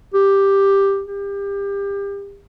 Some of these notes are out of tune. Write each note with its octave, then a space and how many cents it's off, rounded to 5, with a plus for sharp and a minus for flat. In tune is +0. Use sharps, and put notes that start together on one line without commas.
G4 +5
G4 +30